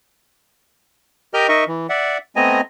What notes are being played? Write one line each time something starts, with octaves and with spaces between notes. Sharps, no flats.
G4 A#4 D#5 G5 F6 G6
D#4 A#4 D#5 E5 C#6
E3
D5 E5 F#5
A3 B3 C4 D#5 G#5 A#5